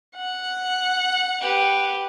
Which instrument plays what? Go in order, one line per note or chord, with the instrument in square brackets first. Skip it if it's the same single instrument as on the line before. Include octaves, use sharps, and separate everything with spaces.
[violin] F#5
[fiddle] G4 B4